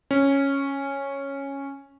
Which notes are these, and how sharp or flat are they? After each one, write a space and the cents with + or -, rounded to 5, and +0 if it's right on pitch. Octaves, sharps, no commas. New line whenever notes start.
C#4 -5